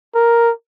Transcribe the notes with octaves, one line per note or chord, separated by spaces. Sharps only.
A#4